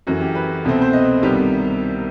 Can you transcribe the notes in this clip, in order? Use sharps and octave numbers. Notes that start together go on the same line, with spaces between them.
F#2 E3 A3 F#4
G4
B4
C2 B2 A3 C4
C5
D#5
C2 C3 D#3 G3 B3